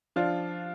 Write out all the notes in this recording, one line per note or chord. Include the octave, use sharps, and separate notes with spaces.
F3 D4 F4